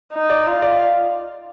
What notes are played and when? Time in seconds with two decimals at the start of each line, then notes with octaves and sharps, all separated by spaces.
0.12 D#4
0.30 D5
0.47 F4
0.62 D5